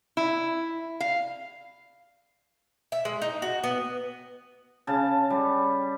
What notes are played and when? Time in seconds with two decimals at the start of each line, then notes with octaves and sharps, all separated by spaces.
0.17 E4
1.00 F5
2.92 E5
3.05 G#3
3.22 D#4
3.42 F#4
3.64 B3
4.87 C#3 A5
5.30 G3